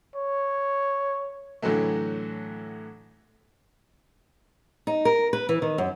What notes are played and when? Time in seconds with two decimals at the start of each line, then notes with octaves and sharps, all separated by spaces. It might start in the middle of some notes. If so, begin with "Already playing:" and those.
0.16 C#5
1.62 A2 D3 E3 F#3 A3
4.87 D#4
5.05 A#4
5.33 B4
5.49 E3
5.62 D#3
5.78 F#2